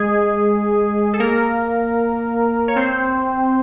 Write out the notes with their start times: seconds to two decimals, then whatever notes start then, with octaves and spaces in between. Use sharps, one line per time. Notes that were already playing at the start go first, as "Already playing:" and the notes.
Already playing: G#3 G#4
1.13 A4
1.20 A#3 A#4
2.68 C#5
2.76 C4 C5